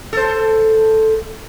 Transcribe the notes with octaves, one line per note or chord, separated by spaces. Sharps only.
A4 C5